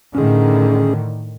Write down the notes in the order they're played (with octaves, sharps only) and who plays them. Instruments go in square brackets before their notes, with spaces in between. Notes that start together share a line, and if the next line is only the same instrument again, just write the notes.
[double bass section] A2 D3 D#3 [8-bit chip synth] C#4 G#4